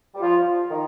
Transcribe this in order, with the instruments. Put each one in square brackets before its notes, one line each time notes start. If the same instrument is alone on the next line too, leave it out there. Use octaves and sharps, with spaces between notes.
[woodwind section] G3
[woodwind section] F3 [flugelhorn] F4
[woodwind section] D#3